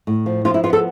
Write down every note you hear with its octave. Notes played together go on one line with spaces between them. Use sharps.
A2
F3
F3 F4
E4
B3 F4
A4